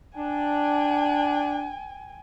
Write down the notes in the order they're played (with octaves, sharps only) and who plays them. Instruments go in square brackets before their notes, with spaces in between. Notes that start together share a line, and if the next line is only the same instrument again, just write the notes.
[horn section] D4 [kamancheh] G5 G#5